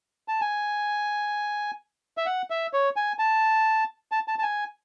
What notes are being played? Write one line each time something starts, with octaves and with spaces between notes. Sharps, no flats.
A5
G#5
E5
F#5
E5
C#5
G#5
A5
A5
A5
A5
G#5